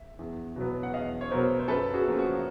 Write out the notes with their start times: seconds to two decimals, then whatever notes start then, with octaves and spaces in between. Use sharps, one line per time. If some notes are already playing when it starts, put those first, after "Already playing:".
Already playing: E5
0.19 E2
0.56 B2 F#3 B3
0.83 F#5
0.94 E2 D#5 F5
1.21 C#5
1.31 B2 F#3 B3 A#4 C5
1.59 C5
1.68 F#2 A4 B4
1.94 F#4 G#4
2.07 C#3 F3 A#3
2.18 F#4